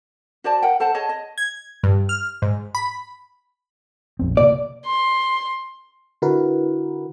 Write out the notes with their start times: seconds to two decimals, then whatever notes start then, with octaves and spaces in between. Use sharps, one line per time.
0.44 F#4 C5 D5 A5
0.62 A#4 F#5 G5
0.80 A4 C5 F#5 A5
0.94 G#4 C#5 D#5 A5
1.09 D#5
1.38 G#6
1.84 G2
2.09 F6
2.42 G#2
2.75 B5
4.19 A#1 F2 C4
4.37 C3 A#3 D5
4.86 C6
6.22 D3 E4 F#4 A#4 B4